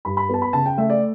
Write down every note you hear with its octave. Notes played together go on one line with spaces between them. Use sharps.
G2 B5
B5
B3 A5
B5
C#3 A5
G5
A3 E5
D5